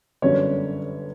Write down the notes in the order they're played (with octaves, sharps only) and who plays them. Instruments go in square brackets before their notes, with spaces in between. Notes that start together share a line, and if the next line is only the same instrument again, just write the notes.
[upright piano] G1 F#2 D3 G3 C#4 C#5